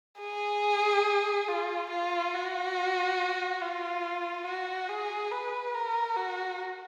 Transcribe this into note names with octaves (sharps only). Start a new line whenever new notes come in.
G#4
F4
F4
F#4
F4
F#4
G#4
B4
A#4
F#4